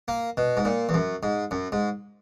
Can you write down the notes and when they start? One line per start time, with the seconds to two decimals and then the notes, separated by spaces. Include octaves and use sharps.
0.08 A#3
0.37 B2
0.57 G#2
0.65 A#2
0.89 E2
0.94 F#2
1.23 G#2
1.51 F#2
1.72 G#2